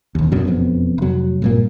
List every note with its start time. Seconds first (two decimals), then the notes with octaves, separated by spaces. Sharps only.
0.15 E1 D#2
0.32 F#2 B2 F#3
0.47 E1 F2 B3
0.98 F1 F#3
1.42 G2 A#2 A#3